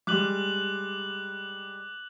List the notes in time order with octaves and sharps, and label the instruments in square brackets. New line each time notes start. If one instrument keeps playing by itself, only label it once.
[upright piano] G3 G#3 [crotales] D6 F#6 F#7